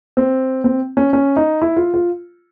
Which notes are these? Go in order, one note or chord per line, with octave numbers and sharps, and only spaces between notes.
C4
C4
C#4
C#4
D#4
E4
F4
F4